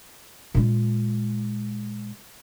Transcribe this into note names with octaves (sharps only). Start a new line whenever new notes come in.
A#2 G#3